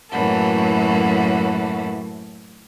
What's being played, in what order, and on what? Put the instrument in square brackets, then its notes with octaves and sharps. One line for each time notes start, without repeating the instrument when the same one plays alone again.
[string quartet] F#2 A2 E3 A#3 F#4 A4